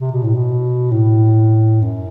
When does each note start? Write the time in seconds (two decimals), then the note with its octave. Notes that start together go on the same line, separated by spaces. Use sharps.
0.01 C3
0.12 B2
0.23 A2
0.34 B2
0.91 A2
1.82 F#2